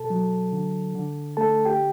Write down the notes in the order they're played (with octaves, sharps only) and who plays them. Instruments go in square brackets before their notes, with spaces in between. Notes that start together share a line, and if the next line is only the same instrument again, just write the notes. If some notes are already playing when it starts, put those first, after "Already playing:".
Already playing: [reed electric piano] B2 A4 A5
F#3
D3
D3
A3 A4 A5
G4 G5